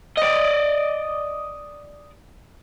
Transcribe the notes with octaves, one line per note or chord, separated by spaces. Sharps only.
D5 D#5